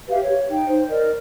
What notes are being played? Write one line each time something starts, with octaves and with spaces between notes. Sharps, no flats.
G4 B4 E5 F5
C#5
D#4 G5
C5
A#4 D5 D#5